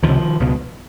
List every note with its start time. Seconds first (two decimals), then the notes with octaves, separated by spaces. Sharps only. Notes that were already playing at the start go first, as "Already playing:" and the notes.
0.03 C#2 C3 D#3 F3
0.40 C#2 B2